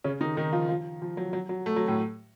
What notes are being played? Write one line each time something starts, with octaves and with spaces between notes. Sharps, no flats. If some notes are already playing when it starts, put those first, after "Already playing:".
C#3 C#4
D#3 D#4
D#3 D#4
F3 F4
F3 F4
F3
F#3
F#3
F#3
A3
F#3
A2 A3